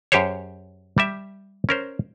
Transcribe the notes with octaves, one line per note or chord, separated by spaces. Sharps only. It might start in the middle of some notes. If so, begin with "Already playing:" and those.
F#2 G4 G#4 C5 C#5
G3 G4 E5
C#4 A#4 C5